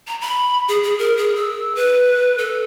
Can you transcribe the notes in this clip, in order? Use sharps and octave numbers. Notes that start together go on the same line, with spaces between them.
A#5
B5
G#4
G#4
A#4
G#4
E6
B4
A4